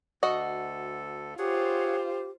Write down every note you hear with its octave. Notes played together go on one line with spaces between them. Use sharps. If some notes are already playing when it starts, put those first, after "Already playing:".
D2 F#4 A4 D#5
F4 G4 G#4 C5 C#5 F#5